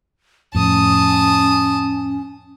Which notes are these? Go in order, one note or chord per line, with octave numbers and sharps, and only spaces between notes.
F2 A2 C#4 A5 D#6